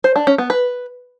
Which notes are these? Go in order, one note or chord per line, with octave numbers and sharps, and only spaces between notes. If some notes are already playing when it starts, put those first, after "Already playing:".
C5
D4
C#4
B3
B4